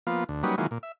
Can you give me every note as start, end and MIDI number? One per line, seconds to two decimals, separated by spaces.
0.07 0.24 53
0.07 0.24 58
0.07 0.24 59
0.07 0.24 65
0.29 0.43 38
0.43 0.56 54
0.43 0.56 55
0.43 0.56 58
0.43 0.56 61
0.43 0.56 63
0.43 0.56 71
0.58 0.67 51
0.58 0.67 52
0.58 0.67 54
0.58 0.67 56
0.58 0.67 58
0.58 0.67 65
0.71 0.78 46
0.83 0.92 76